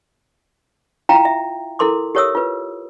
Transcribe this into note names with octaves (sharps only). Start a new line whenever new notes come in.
E4 F4 F5 G5 A#5
E5
E4 A4 A#4 C6 D6
G4 A#4 C#5 E5 D#6 E6
F4 B4